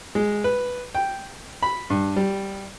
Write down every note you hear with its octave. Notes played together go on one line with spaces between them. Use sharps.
G#3
B4
G5
B5
G2
G3